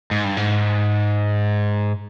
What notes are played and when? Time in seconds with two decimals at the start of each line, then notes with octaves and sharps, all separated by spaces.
0.11 G#2
0.24 G2
0.37 G#2